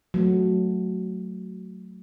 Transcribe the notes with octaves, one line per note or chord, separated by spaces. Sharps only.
F#3 A3